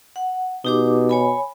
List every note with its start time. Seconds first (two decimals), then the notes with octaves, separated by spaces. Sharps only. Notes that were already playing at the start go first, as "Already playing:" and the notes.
0.16 F#5
0.65 B2 D#4 G4 D6
1.09 C#5 G#5 B5